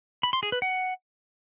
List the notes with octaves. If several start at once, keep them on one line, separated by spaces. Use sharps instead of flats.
B5
C6
G#4
B4
F#5